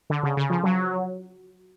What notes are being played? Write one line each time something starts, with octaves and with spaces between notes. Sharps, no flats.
D3
C#3
C#3
F3
F#3